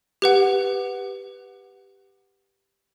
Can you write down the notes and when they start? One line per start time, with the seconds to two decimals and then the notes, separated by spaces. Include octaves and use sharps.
0.22 G4 B4 F#5